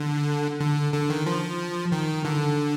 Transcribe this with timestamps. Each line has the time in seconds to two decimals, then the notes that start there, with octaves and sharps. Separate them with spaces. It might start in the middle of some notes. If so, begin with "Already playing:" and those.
Already playing: D3
0.60 D3
0.94 D3
1.10 D#3
1.26 F3
1.92 D#3
2.25 D3